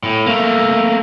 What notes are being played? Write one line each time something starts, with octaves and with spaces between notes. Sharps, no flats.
A2
A3 A#3